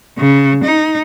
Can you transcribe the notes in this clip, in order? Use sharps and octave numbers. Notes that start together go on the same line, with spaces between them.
C#3
D#4